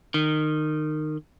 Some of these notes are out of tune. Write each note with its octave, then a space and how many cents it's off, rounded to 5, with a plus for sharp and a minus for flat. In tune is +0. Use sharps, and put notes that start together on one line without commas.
D#3 -20